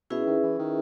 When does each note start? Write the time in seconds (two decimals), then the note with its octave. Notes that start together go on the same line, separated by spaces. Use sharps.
0.10 B2 C#4 E4 G#4 B4 E5
0.26 D#3
0.43 E3
0.59 D#3